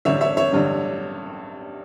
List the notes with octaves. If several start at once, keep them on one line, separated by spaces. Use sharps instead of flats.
A1 G2 D3 C#5 E5
C#5 E5
C#5 E5
A1 G2 D3